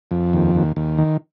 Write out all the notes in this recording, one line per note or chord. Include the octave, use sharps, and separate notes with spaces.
F2
D#2
D#2
D#2
D#3